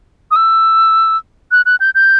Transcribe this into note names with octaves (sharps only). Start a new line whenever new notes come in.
D#6
E6
F#6
F#6
G6
G6